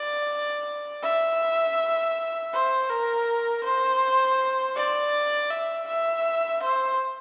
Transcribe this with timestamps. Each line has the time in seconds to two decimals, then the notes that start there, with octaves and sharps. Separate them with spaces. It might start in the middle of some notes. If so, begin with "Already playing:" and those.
Already playing: D5
1.04 E5
2.53 C5
2.90 A#4
3.64 C5
4.76 D5
5.51 E5
5.88 E5
6.63 C5